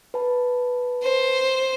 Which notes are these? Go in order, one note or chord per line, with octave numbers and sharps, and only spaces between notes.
B4 A5
C5